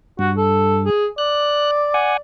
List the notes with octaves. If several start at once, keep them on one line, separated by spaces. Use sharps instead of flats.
G2 F#4
A4
G#4
D5 F#6
F#5 G#5